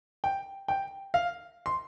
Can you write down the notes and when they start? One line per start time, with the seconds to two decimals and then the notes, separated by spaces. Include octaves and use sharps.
0.24 G5
0.68 G5
1.14 F5
1.66 C6